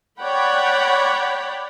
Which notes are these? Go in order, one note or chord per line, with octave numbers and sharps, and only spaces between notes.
C#5 D5 F#5 G5 B5